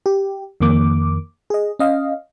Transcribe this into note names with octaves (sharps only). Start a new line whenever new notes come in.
G4
F2 D#3 A#3 D6
G#4 D#5
C#4 D#5 F5